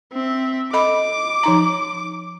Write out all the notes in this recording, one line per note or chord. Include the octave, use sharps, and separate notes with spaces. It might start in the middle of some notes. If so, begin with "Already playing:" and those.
C4 E5
A4 D#5 B5 D6
F3 D#4 A#5